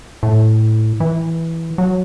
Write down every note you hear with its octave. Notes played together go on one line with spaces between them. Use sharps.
A2
E3
F#3